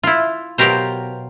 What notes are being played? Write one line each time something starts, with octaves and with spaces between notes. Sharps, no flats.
E4 F4
B2 F#3 F4 G4 A#4 C5